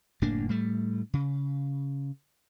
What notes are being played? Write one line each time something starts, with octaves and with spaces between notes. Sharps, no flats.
F#1 A2 A#3 D4
A2 G3 A3
C#3